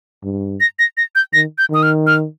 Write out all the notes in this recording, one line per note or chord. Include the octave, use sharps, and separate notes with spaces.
G2
A#6
A#6
A#6
G6
D#3 A#6
G6
D#3 D#6
F6
F6